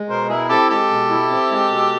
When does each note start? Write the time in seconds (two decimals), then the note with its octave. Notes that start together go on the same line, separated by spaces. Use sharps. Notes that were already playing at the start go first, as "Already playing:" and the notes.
Already playing: G#3
0.09 B2 A#4 C5
0.29 E4 G#4 A#4
0.49 C4 G4 A4
0.69 G#3 G4 A4
0.90 B2
1.10 E4
1.30 C4
1.51 G#3
1.70 B2